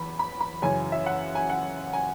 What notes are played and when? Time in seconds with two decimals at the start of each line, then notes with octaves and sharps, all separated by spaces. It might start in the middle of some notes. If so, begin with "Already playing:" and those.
Already playing: E2 B5
0.19 B5
0.41 B5
0.62 F#2 C#3 E3 G#5
0.92 E5
1.06 F#5
1.35 G#5
1.50 F#5
1.93 G#5